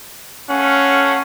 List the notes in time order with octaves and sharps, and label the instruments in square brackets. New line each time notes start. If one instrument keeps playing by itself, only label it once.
[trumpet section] A3 F5 F#5 [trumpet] C#4